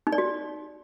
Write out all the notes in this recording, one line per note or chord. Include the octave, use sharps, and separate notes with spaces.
D#4
D5
F#4